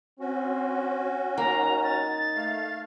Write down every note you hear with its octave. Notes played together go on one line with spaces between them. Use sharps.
C4 C#4 F#4
A#3 D#4 A#5
A6
A3 F5